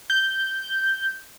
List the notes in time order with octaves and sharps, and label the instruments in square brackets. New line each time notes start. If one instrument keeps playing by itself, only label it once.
[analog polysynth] G6